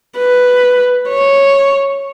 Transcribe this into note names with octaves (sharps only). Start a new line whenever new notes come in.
B4
C#5